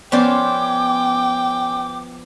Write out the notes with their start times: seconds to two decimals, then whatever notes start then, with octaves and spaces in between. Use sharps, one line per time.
0.12 F3 B3 C#4 C5 D5 G5 D6